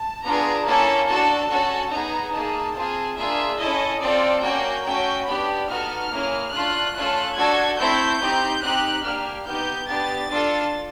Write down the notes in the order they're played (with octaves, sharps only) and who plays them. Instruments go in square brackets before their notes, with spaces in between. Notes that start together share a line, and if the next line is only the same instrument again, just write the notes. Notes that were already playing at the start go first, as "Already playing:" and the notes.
Already playing: [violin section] A5
B3 D4 F4 G#4 A#5
A#3 C#4 E4 A4 A5
D4 F#4 A4 A5
C#4 F#4 A4
B3 D#4 G#4 A#5
A#3 D#4 G#4 A5
C4 F4 G#4
A#3 D4 F4 G#4 E5
C#4 E4 A4 D#5
C4 F4 A4 D5
A#3 C#4 F#4 G5
A3 C#4 F#4 G5
B3 D4 G4 B5
B3 D#4 F#4 A4 F6
A#3 C#4 E4 G#4
A3 D4 F4 F#6
A3 C#4 F4 A4
A3 D4 F#4 A4 G#6
A3 C4 E4 G6
C4 D#4 G4
C4 D#4 G4 F#6
A#3 D4 G4 F6
B3 D#4 G4 G6
B3 D4 G4 A6
D4 F4 A4